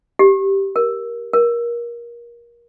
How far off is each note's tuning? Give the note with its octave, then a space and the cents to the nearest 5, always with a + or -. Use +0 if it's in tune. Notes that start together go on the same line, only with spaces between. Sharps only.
G4 -5
A#4 +15
A#4 +25